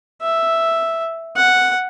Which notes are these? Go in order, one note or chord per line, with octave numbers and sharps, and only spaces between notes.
E5
F#5